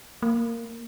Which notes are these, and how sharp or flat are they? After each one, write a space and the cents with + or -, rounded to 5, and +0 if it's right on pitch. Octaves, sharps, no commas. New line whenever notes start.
A#3 -10